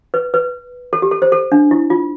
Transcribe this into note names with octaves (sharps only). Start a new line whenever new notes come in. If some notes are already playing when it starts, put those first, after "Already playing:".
B4
B4
A4
G4
A4
C5
A4
D4
E4
F4